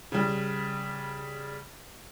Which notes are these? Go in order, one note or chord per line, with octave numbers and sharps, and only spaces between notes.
C#3 G3